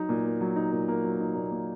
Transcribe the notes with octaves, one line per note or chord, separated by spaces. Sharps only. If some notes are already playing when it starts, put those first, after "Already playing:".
Already playing: F#3 D#4
A#2
A#3
F#3
D#4
A#2
A#3
F#3
D#4
A#2
A#3